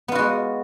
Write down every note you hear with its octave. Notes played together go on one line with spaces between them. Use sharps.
G#3 B3 F4 F#4